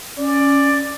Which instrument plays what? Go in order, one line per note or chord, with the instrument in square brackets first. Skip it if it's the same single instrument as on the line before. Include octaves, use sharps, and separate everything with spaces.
[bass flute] C#4 [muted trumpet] D5